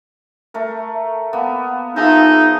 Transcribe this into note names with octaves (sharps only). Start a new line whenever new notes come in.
A3 A#4
A#3 B3 D6
F3 D#4 G#4 E5